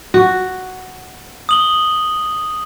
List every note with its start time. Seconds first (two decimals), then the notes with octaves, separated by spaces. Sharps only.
0.14 F#4
1.49 D#6 F#7 G7